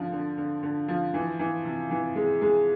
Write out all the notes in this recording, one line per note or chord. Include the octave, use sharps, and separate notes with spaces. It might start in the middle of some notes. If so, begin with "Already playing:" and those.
Already playing: D3 F3
D3
D3
D3
F3
E3
E3
C3
E3
G#3
G#3